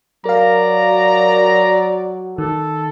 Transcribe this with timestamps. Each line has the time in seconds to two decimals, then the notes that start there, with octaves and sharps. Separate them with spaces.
0.25 F#3 A#4 D5 F5 A#5
2.38 D#3 A4